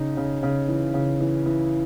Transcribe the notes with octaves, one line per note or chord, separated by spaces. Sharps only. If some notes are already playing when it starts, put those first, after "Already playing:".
Already playing: C#3 D#4
C#3
C#3
E3
C#3
E3
E3